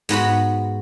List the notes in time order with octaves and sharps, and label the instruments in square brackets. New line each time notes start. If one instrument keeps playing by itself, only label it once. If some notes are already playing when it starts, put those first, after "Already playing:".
[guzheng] G#2 B3 F#4 B5